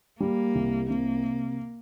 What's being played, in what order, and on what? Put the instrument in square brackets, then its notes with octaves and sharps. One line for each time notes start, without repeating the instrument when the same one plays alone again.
[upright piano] G3 [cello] A#3
[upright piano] C2
[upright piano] C3 [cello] A#3